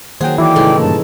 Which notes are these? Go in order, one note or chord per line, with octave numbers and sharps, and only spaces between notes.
D#3 F#3 A#3 G#4 C5 F#5 G5
E3 E4 F#4 D5 G5 D6
A2 C#3 G#3 D#4 A4
G2 A#2 A#3 A5